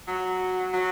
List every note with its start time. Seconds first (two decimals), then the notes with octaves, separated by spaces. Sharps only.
0.07 F#3
0.73 F#3